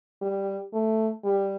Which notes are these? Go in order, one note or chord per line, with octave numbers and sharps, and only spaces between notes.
G3
A3
G3